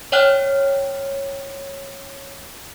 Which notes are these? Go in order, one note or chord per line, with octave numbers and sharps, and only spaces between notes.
C#5 D5 G5 F6 F#6